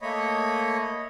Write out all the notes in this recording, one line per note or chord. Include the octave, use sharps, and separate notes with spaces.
A3 A#3 C#5 D#5 B5